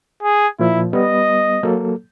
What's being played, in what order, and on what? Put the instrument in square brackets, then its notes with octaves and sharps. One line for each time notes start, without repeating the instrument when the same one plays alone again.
[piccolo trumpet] G#4
[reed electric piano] A#2 F3 [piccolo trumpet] E4
[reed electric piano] G3 B3 [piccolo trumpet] D#5
[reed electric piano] F#3 A#3 A4